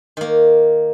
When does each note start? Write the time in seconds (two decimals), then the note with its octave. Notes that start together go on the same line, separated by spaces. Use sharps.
0.17 D#3 A#3